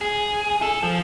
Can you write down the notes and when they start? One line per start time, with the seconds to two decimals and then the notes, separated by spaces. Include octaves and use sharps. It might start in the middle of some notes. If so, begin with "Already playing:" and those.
0.01 G#4
0.62 A4
0.83 F3